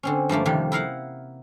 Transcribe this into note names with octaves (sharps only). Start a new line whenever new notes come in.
D3 C4 C#4
G2 F3 A3 A#3
F2 C3 D#3 F3 G3
E4 A#4 F5 F#5